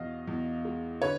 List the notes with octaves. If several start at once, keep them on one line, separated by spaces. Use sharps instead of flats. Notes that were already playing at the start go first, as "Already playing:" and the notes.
Already playing: E2 B2 D#5 F5
E2
G#3
D3 B4 C#5